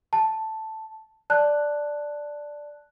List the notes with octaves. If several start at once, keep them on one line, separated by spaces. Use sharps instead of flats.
A5
D5 A5 F#6